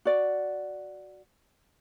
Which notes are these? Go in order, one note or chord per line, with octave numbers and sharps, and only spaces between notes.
F#4 D5